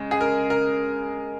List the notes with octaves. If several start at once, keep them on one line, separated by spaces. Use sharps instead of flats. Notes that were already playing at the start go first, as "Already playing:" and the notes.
Already playing: C#3 G#3
G#4
A#4
A#4